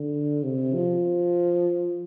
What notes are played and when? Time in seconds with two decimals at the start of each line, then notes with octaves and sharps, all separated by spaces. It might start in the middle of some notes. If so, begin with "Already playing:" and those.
Already playing: D3
0.43 C3
0.74 F3